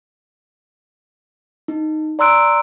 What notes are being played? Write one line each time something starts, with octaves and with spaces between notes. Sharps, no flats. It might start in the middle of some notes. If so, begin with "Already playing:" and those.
D#4
D5 A#5 C6 E6 F#6 D7